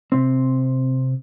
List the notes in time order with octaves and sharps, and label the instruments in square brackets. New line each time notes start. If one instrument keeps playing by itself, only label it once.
[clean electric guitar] C3 C4